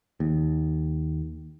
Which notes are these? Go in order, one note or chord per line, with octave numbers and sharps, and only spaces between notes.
D#2